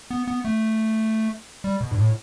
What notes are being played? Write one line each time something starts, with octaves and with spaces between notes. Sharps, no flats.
B3
B3
A3
G3
B2
G2
A2